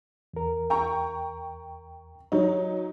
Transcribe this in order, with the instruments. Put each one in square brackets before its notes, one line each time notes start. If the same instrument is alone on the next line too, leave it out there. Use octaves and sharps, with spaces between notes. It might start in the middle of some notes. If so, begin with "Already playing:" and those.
[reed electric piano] E2 A#4
[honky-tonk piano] G5 A#5 C#6
[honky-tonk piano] F#3 D#4 [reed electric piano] C#5